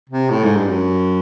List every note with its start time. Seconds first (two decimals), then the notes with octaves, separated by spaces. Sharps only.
0.10 C3
0.30 A2
0.43 G#2
0.56 G2
0.69 F#2